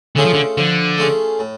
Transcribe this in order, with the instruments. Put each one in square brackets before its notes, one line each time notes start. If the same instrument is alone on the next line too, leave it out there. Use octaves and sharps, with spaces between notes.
[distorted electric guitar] D3 [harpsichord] A3 C#4 F4 G#4
[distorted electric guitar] F3
D3
[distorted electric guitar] D3 [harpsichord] F3
[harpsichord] A3 C#4 F4 G#4
A2